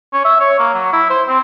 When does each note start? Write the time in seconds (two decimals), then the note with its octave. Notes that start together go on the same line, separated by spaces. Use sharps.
0.13 C#4
0.25 E5
0.40 C#5
0.59 A#3
0.74 F#3
0.93 E4
1.10 C5
1.28 C4